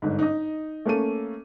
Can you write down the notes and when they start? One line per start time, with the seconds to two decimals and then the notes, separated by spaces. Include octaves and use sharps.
0.02 G1 G#2
0.19 D#4 D#5
0.86 A3 A#3 C#4 A4 D#7